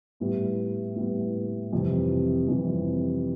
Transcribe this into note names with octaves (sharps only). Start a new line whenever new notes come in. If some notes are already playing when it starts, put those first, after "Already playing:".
A2 G3 B3
A2 G3 B3
F2 C3 E3 G3
F2 C3 E3 G3